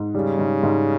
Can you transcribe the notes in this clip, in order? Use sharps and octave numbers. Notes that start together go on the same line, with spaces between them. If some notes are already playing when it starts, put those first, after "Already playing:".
Already playing: G#2
C#3 G3
G#2
G#2